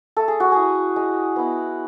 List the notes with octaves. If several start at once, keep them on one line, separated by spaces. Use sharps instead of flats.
A3 A4
G#4
F#4
E4 G#4
G#3
B3 E4